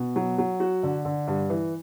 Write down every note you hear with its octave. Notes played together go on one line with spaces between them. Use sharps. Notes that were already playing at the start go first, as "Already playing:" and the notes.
Already playing: B2
F#3
F#3
F#4
D3
D3
G2
E3